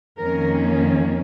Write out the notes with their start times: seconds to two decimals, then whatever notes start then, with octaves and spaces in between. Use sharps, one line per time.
0.20 F2 D#3 A#3 C#4 A#4